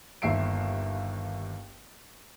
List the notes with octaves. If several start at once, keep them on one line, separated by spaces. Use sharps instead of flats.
G1 D#2 E5 C7 D7